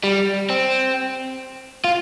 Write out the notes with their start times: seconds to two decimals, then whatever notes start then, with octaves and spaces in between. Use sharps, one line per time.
0.04 G3
0.50 C4
1.84 F4